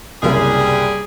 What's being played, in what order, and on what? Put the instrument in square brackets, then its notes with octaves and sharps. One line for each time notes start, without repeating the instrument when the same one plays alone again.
[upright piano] F#1 C2 [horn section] G3 G#4